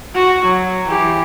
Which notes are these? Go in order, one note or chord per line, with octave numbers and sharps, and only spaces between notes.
F#4
F#3
E3 G4